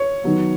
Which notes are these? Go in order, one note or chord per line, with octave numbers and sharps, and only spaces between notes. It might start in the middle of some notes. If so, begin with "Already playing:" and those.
Already playing: C#5
D#3 F#3 B3